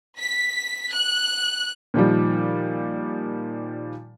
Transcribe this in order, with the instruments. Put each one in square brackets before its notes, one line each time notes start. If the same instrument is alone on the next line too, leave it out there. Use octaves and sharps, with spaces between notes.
[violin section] B6
F#6
[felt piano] A#2 D#3 F3 G3